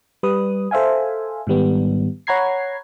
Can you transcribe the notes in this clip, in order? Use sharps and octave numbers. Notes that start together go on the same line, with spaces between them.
G3 B4 D#6
A4 C5 E5 F5 G#5
G#2 D#3 G3 B3
C#5 F#5 A#5 B5 G#6 C7